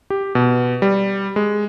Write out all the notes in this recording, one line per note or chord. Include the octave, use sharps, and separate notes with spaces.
G4
B2
G3
G#3